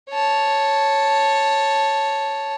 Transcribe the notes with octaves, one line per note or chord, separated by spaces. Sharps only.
C#5 A5